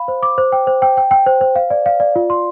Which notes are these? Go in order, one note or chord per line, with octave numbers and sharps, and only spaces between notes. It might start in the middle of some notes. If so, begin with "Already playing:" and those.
Already playing: F5 B5
C5
D6
C5
G5
C5
G5
G5
G5
C5
C5
F5
D5
F5
D5
F4
C6